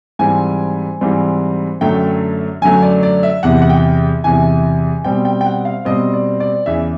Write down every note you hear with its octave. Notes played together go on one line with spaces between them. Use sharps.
G#2 E3 G3 C4 G#5
G#2 E3 G3 C4
F#2 D3 F#3 A3 G5
F#2 D3 F#3 A3 G#5
D5
D5
E5
E2 C3 E3 F#5
F#5
G5
E2 C3 E3 G#5
B2 G3 C4 G5
G5
G5
F#5
F5
B2 G3 C4 D#5
D5
D5
E2 C#3 E3 E5